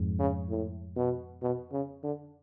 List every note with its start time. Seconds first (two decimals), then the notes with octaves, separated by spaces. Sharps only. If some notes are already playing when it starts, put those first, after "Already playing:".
Already playing: F2 G#2
0.20 C#3
0.50 A2
0.97 B2
1.42 B2
1.72 C#3
2.04 D3